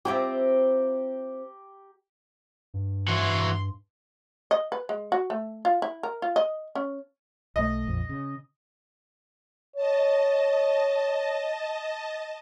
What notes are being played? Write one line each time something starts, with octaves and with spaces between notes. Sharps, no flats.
C4 E4 F4 G4 G5 A#5
G2
E3 F#4 C6
D#5
B4
G#3
F#4
A3
F4
E4
A#4
F4
D#5
C#4
B1 A3 D#5
A#1 F2
C#3
C#5 D#5 A5